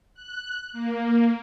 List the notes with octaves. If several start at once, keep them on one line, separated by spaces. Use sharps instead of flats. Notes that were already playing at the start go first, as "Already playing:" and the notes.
F#6
A#3